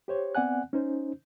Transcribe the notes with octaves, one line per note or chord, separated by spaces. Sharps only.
G4 C5 C#5
B3 C4 D5 F#5 G#5 F#6
C#4 D#4 C5